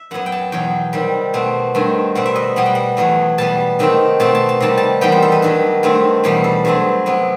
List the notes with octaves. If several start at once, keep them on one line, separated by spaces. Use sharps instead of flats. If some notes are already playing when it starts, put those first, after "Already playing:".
Already playing: E5
F#2 F#3 B3 F#5
G5
A5
E2 B2 F#3 G5
C3 D#3 G3
B2 A3 C4
G2 D#3 A3 C4
B2 G3 C4 F#5
E5
D#5
B2 G3 B3 F#5
G5
F#5
E2 B2 F#3 A3
B2 G3 B3 A5
C3 D#3 A3 C4
B2 A3 C4 A5
A5
A5
C3 D#3 G3 A5
A5
E2 D#3 G3 B3 G5
C5
A4
B4
G2 D#3 F#3 A4
G2 D#3 A3 C4
E2 B2 G3 B3 G4
A4
G2 F#3 A3 C4 A4
C3 F#3 B3